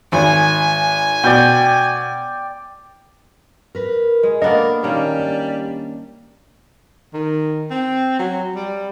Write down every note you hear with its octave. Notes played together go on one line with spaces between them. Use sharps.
G#1 G#5
B2 D5 G5
A#4 B4
G#3
A#3 B3 D4 A4 A#4 D#5
D#3 G3 A#3 C#4
D4
D#3
C4
F#3
G3